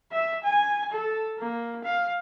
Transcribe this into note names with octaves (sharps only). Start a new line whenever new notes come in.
E5
G#5
A4
A#3
F5